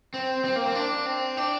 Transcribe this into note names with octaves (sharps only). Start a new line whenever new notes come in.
C4
C4
A#3
C4
D4
C4
D4